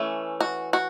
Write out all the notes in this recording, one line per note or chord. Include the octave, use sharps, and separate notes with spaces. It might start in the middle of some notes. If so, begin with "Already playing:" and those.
Already playing: E3 A3 C#4
F#4
F#4